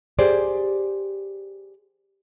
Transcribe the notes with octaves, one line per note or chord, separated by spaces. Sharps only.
G4 G#4 C5 D5